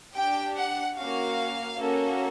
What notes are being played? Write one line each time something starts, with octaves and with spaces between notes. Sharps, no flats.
D4 G4 G5
F#5
A#3 C#4 F#4 F5
A#3 C#4 F#4 A4